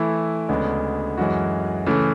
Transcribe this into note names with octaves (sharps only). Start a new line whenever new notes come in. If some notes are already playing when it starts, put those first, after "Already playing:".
Already playing: E3 A3 E4
D2 C#3 G#3 B3 D4
F#2 E3 G#3 C#4 F#4
C#3 E3 A3